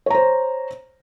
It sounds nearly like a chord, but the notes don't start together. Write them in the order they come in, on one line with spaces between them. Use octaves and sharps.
C#5 A#5 C5